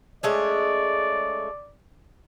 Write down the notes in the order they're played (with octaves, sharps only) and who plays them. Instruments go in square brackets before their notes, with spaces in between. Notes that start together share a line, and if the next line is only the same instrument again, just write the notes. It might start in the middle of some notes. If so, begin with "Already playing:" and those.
[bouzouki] G#3 A3 C#4 [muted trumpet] D5